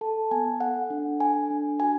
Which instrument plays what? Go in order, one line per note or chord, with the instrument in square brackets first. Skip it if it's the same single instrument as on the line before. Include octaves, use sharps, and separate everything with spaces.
[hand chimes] A4 A5
B3 G#5
A4 F#5
D4
A4 G#5
D4
F#4 G#5